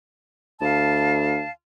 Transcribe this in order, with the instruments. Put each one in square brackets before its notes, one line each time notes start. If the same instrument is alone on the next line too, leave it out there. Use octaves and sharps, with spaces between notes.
[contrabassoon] D2 [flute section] F5 A5